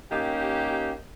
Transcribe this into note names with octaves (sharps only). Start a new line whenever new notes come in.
A#3 C#4 D#4 G4